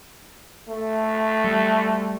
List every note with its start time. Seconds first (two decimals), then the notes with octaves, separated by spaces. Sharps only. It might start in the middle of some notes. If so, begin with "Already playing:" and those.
0.68 A3
1.44 G3